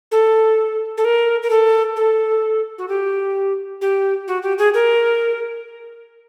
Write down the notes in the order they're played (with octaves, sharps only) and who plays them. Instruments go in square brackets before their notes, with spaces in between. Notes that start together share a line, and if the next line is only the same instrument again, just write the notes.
[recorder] A4
A4
A#4
A#4
A4
A4
F#4
G4
G4
F#4
G4
G#4
A#4